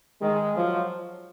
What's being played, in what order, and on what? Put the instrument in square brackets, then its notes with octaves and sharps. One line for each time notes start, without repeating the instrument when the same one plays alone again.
[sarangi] D#3 [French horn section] G#3
[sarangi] F3 [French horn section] F#3